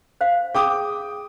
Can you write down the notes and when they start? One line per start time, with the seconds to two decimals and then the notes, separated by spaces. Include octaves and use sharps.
0.21 C5 F5
0.55 G#4 G5 D6 D#6